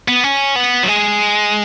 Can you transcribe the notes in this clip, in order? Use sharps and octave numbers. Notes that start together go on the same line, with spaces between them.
B3
C#4
B3
F#3
G#3